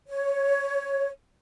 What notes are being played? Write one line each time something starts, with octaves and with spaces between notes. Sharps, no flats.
C#5